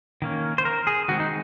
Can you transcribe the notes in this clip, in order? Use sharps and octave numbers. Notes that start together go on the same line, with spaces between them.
D#3 A#3 C#4
C5
A#4
G#4
D#3 G#3 C4 F#4
D#4